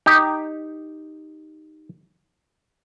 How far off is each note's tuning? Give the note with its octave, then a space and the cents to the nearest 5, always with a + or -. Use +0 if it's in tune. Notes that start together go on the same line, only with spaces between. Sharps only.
D#4 +0 G4 +0